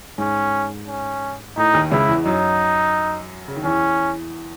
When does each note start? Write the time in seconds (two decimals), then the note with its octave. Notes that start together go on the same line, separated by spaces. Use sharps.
0.18 G#2 C#4
0.87 C#4
1.57 A2 D#4
1.74 D#2 D#3
1.91 C#2 C#3 E4
2.08 E2 E3
2.25 F#2 F#3 D#4
3.48 C#3
3.56 D#3
3.64 E2 E3 C#4